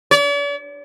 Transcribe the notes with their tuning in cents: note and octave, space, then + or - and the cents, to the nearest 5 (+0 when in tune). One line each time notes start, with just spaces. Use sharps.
D5 -45